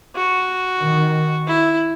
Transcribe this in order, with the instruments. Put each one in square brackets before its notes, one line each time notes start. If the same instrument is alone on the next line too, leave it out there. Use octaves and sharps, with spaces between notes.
[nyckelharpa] F#4
[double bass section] D#3
[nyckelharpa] E4